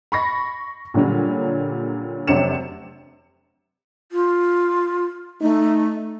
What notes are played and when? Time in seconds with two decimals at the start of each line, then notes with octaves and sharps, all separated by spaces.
0.12 B5 C#6 A#6
0.94 A#2 D3 F#3 G3 C#4
2.28 F1 C3 F#3 D4 C#7 E7
4.12 F4
5.42 A3 D#4